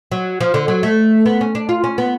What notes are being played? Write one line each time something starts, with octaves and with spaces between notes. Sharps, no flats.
F#3
F3
D3
F#3
A3
B3
C#4
D4
F4
C#4
B3